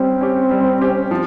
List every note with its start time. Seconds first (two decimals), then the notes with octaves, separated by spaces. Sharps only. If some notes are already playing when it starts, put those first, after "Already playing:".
Already playing: G3 C4 C#4 G4
0.21 C#4 G4
0.51 G3
0.82 C#4 G4
1.11 F3